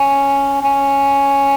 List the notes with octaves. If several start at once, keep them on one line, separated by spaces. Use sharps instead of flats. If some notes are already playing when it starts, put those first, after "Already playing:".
Already playing: C#4
C#4